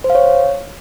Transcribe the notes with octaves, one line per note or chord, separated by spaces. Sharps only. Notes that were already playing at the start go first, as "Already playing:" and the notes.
C5
F5
C#5